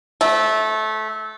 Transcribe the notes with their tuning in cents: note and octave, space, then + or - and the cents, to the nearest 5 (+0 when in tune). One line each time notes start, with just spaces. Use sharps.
A3 -20